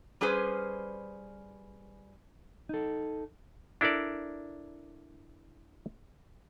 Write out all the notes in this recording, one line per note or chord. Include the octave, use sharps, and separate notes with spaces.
G3 C#4 G#4 B4 C5
D#4 A4
D4 E4 A4 A#4 D5